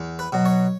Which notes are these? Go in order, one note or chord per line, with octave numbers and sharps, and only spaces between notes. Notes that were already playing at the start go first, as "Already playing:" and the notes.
Already playing: E2
B4
B2 F#3
C#5